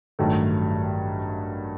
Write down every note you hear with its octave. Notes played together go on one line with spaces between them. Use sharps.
A1 G2 D#3 F#3 A3